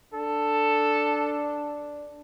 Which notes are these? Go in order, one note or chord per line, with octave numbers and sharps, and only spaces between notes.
D4 A4